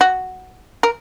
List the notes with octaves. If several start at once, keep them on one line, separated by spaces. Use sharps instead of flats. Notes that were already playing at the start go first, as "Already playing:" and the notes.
F#4
A#4